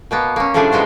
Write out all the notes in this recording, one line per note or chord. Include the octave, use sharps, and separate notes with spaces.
B2 A#3 B3
A#3 C#4
A2 C#3 F3 G3 D4 G#4
C3 G#3 B3 C5